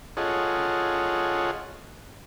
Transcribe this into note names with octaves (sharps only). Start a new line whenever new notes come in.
F4 G#4 A4 C#5 D#5 F#5